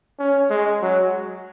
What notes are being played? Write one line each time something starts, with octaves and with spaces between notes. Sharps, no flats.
C#4
G#3
F#3